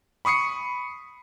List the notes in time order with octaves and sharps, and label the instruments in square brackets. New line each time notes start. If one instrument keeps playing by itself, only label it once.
[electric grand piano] B5 C#6 D#6 C7 C#7